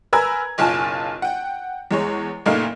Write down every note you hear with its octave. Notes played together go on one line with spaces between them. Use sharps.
A#4 B4 G#5 A#5 E6 G#6
F#1 B1 F4 G#5 A5
F#5 G5
E2 G#3 C#5
F#1 A#2 A3 D#4 F5